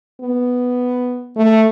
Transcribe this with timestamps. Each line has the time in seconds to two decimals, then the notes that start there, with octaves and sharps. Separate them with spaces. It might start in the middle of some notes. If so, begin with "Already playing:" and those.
0.21 B3
1.36 A3